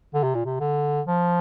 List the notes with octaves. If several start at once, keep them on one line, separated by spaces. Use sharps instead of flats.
D3
C3
A#2
C3
D3
F3